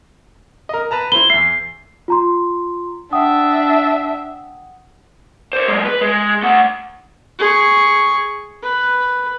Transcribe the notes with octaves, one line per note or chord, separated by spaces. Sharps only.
A#4 D#5
B4 A5 A#5
E4 C5 B5 G7
E2 E5 C7
F4 A#5 C6
D4 E5 F#5 G5 D#6
C5 D5
F#3 G#3
B4
G#3
A3 F#5
G#4 C#6
B4